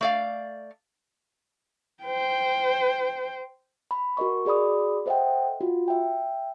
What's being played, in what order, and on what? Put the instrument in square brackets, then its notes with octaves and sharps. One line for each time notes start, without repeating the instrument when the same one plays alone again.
[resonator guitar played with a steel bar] A3 D5 F5
[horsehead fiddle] C5 G5
[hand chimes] B5
F#4 A#4 D#5 C#6
F#4 G#4 D5 B5 D#6
A4 C5 D#5 E5 F#5 G5
F4 F#4
E5 G5